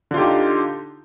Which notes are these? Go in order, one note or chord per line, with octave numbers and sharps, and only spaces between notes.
D3 D#4 F4 G4